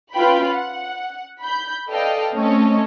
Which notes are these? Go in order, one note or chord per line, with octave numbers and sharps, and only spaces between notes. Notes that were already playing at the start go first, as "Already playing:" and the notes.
C#4 F4 B4 F5 G5 B5
F#5
B5 G6
A4 B4 D5 D#5 F5 G5
A3 C4 C#4 A4 C#5 D#5